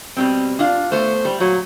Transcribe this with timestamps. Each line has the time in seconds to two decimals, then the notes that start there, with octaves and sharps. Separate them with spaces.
0.17 B2 G3 C4
0.59 D4 F4 F5
0.92 A3 B3 C5
1.25 G3
1.40 A#2 F#3